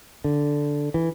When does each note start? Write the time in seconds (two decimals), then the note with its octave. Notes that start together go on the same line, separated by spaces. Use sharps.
0.24 D3
0.94 E3